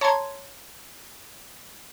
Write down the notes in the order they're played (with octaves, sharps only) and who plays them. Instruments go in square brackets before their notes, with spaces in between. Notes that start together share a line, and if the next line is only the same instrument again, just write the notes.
[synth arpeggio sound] C#5 A5 A#5 C6 G#6